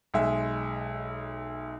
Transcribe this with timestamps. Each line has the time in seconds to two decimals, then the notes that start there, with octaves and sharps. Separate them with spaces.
0.14 B1 G#3 E5